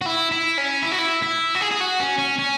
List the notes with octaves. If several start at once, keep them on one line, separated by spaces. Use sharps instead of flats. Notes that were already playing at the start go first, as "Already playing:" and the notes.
F#4
E4
E4
C#4
E4
F#4
E4
E4
F#4
G#4
G#4
F#4
C#4
C#4
C#4